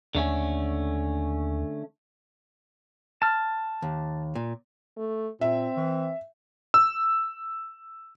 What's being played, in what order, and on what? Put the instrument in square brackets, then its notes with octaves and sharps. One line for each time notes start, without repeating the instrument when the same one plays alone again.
[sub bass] D#2 [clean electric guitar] D3 A3 C#4
[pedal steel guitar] A5 F6
[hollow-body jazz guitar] D#2
A#2
[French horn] A3
[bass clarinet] A#2 [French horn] C4 [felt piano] E5
[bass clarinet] E3
[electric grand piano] E6